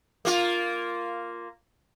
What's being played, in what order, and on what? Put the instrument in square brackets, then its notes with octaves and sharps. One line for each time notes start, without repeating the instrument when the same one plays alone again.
[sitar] A#3 F4